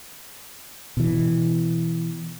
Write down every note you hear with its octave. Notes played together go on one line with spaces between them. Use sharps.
B2 E3